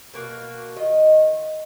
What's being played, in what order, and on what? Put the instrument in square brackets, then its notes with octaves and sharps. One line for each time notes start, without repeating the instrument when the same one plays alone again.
[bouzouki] B2 A#3 F#4
D#3 F4 D#5